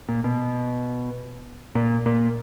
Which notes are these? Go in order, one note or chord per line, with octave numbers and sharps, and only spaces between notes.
A#2
B2
A#2
A#2